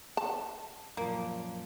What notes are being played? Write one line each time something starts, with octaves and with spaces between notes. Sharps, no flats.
A5
F#2 A#2 F3 A#3